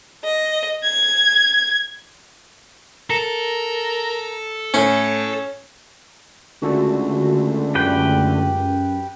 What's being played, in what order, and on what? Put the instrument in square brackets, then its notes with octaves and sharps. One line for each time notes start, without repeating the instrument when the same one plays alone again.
[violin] D#5
G#6
[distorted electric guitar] A4 [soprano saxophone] A#4
[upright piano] A2 [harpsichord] C#4 [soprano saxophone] C#5
[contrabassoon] C#2 [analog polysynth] D3 A3 [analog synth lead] F#4
[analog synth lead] F#2 [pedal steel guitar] G4 B4 G5